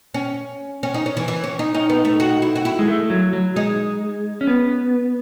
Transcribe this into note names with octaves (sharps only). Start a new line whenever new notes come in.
C#4
C#4
D#4
C#4
E3
E3
C#4
D#4
C#4 D#4
B3
A3
F#4
E4
F#4
E4
G#3
A3
F#3
F#3
G#3 D#4
C#4
B3